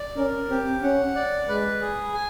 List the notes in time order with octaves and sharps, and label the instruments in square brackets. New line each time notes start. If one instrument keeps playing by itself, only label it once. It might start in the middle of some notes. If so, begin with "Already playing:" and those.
Already playing: [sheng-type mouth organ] D5
[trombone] C#4 [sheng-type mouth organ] A#4
[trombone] C4 [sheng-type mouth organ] G4
[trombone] C#4 [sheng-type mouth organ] F#5
[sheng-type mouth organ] D5
[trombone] G#3 [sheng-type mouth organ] B4
[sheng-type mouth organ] G#4
G#5